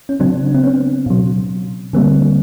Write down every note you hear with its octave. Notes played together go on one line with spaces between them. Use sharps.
C#4
C#3 F#3 C4 D4
C4
B3 C#4
B2 F#3
D3 G3 A#3 C4